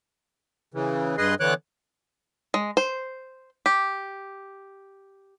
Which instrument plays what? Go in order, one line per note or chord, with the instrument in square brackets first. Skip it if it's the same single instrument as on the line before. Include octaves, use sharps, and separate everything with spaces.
[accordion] C#3 E3
G2 G#4 B4 D#5 C6
D3 E3 B3 C#5 D6 F#6
[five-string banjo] G#3
C5
G4